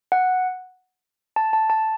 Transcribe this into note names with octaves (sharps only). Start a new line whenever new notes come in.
F#5
A5
A5
A5